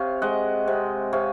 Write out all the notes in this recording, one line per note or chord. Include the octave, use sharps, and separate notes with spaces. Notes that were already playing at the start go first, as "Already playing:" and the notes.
Already playing: C3 C#5 F5
G#3 D#5 F#5
C3
C3 C#5 F5